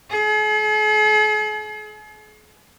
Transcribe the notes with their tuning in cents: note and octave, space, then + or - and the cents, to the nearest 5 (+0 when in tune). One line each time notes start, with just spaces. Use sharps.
G#4 +45